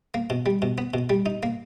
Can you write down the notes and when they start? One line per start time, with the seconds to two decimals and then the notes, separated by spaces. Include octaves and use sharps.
0.14 A#3
0.30 B2
0.46 G3
0.62 B2
0.78 B3
0.94 B2
1.10 G3
1.26 D#4
1.43 A#3